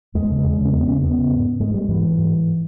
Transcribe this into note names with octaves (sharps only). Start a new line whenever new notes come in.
E2 G#3
C#3
E2
C#3
C#4
E2 B3
C#3 C#4
E2 B3
C#3
G#2
G#2 G#3
G3
G#2 E3
G#2